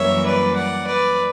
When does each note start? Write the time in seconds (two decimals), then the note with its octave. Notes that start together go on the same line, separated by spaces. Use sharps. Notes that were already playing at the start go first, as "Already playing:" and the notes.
Already playing: F#2 E3 G3 A#3 C#5 E5
0.26 B4 D5
0.56 D5 F#5
0.87 B4 D5